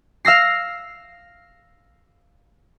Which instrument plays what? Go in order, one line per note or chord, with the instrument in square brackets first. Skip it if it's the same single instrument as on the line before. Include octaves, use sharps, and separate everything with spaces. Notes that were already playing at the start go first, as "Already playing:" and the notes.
[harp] F5 E6 A#6 C7